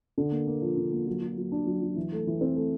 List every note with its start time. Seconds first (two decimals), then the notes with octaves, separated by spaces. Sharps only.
0.18 D3
0.32 A#3
0.47 A#3
0.62 F3
0.77 D3
0.92 A#3
1.07 F#3
1.22 F#3
1.37 F#3
1.52 D4
1.67 F#3
1.82 F#3
1.96 E3
2.12 A3
2.27 E3
2.41 C4
2.56 A3